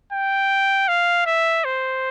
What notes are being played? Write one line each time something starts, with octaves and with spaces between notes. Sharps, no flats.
G5
F5
E5
C5